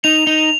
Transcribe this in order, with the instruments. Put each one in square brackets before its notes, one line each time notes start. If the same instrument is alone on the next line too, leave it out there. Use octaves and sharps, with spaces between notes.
[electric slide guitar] D#4 [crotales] F7
[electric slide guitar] D#4